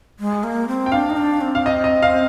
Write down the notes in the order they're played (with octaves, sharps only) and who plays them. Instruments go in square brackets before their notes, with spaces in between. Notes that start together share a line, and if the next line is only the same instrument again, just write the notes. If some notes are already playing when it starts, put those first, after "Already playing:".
[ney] G#3
A#3
C4
[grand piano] G5
[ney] D4 [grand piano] F5
[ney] D#4
D4
C4
[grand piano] F5
D#5
D#5
F5